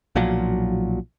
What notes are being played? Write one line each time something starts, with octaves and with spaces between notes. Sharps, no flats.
B1 A#2 F3 F#3